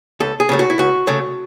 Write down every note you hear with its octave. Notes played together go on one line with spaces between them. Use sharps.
C#2 A4
G#4
C#3 F#3 A3
F#4
E4
C#2 F#4
C#3 F#3 A3